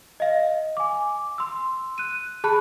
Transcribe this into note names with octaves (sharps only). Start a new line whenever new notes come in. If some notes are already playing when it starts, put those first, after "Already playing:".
D#5 F5
G#5 D6
C6 E6
F#6 D#7
G#4 A5 B5 F#6 D#7